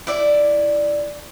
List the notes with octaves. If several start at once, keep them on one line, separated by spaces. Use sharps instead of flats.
E4 D5